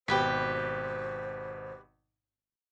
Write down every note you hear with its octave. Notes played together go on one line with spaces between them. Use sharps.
G#1 B2 G4 B4 C5 B5